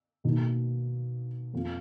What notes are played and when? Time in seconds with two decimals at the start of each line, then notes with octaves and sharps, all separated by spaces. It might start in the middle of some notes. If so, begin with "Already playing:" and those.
0.24 B2 A#3 D#4
1.53 F2 F3 B3 F4